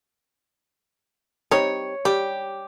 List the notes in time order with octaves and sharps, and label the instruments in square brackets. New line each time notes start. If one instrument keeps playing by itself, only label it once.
[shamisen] G3 C4 D#4 [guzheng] C#5
[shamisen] G3 [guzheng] G4